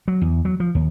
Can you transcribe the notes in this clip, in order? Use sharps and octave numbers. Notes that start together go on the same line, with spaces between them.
F#3
E2
F#3
F3
D#2